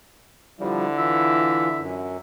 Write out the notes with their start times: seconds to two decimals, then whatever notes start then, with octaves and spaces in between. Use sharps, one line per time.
0.59 D3 F3 G3 E4
0.98 E3 F4 E5
1.78 F#2